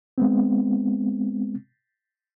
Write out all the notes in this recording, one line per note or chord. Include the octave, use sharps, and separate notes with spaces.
G#3 B3 C4